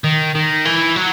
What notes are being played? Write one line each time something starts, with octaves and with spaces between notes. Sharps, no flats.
D#3
D#3
E3
F#3